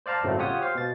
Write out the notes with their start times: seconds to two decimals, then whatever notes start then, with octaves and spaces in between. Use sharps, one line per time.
0.06 C5 D5 F5 A5 A#5
0.23 G1 A2 C#3 F#3 A3 C4
0.39 F4 G4 C#5 F#5 D#6
0.62 C5 F5
0.75 B2 A6